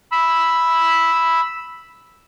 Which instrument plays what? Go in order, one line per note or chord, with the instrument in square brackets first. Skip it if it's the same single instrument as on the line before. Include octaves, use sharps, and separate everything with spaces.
[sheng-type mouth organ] B5 E6